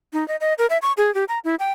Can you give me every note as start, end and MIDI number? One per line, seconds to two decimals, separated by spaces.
0.13 0.26 63
0.28 0.36 75
0.41 0.54 75
0.58 0.66 70
0.70 0.78 76
0.82 0.92 85
0.97 1.13 68
1.15 1.24 67
1.29 1.39 82
1.44 1.55 64
1.59 1.72 79